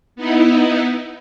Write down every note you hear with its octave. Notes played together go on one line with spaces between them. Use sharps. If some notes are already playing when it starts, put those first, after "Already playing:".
B3 D#4 E4